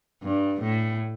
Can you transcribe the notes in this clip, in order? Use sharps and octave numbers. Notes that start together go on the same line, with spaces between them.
G2
A2